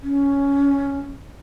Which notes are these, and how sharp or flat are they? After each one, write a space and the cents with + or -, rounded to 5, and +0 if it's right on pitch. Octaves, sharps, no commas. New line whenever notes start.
C#4 +10